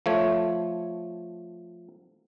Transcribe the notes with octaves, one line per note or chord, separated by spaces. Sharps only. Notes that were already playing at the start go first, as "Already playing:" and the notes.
F3 A3 C#5